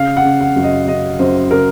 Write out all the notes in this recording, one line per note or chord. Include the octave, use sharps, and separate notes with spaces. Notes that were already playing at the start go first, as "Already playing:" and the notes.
Already playing: C#3 F5
F#5
C#3
F#5
F#2
D#5
C#3 D#5
F#2 C5
C#3 A#4